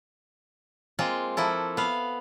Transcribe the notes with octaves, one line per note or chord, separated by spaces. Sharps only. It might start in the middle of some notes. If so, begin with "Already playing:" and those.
G#3 A#3 C4 F4
F3 A#3 E4 A4
B3 F5